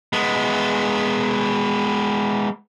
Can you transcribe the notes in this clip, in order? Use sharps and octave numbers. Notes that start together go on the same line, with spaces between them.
G#3 B3